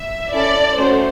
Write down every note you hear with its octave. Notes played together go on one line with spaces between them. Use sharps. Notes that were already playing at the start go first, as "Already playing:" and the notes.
Already playing: E5
C#4 E4 A4 D5
A3 C#4 F#4 A4 C5